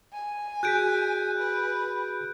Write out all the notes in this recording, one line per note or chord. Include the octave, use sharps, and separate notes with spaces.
G#5
F#4 G#4 F#6 G6 B6 D7
B4